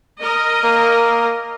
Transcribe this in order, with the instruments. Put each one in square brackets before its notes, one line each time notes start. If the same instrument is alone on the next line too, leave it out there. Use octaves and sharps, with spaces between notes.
[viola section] A#4 D#5
[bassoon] A#3